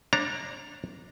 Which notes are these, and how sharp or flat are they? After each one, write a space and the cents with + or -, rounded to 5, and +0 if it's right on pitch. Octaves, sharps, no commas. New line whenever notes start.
D4 +0 C#5 -40 A#5 +0